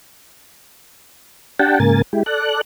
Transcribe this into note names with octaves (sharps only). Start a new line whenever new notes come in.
D4 G4 F#5 G5 A5
G#2 C#3 A#3 A#4 G#5 A6
G#3 E4 G4
A4 D5 F#6